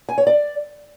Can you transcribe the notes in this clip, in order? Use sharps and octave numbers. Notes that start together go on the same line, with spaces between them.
G#5
C#5
D5